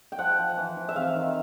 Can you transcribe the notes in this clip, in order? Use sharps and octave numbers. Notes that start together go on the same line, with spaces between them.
G5
F3 F#5
F3
E3
E3
E5
C3 F5
D#3